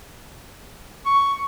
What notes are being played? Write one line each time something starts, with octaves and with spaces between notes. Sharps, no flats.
C#6